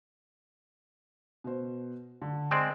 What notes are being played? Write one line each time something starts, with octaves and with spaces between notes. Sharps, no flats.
B2 C5
D3
G#3 C4 D5